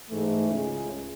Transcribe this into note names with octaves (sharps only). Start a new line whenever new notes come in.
G#2 E3 A3
C#2 C#3 G#3